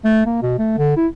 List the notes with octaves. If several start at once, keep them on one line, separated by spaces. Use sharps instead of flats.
A3
A#3
B2
A3
D3
E4